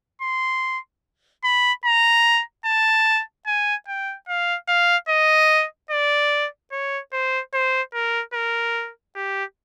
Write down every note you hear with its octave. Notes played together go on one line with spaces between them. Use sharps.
C6
B5
A#5
A5
G#5
G5
F5
F5
D#5
D5
C#5
C5
C5
A#4
A#4
G4